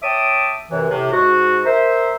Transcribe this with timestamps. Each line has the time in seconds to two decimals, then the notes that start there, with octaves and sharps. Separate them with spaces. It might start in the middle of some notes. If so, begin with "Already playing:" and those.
0.02 C#5 E5 G5 A5 D6 D#6
0.70 F#2 C3 E3
0.89 A2 C3
1.12 G#2 F#4
1.65 A#4 C5 E5